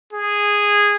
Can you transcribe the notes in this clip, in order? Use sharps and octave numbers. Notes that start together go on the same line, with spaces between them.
G#4